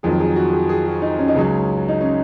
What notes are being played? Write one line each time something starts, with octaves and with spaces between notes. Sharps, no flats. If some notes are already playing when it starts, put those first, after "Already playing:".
F2 D#3 F#3 G#4
G#4
F#4
G#4
G#4
F#4
D#4
C#4
D#4
C#2 C#3 F#3 C#4
D#4
C#4